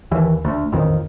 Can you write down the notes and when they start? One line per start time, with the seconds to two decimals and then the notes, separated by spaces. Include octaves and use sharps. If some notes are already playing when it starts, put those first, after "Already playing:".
0.12 D#2 E3
0.45 D2
0.72 A1 F2 D#3